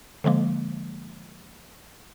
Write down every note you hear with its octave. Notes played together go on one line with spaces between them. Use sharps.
D3 F3 G#3 A#3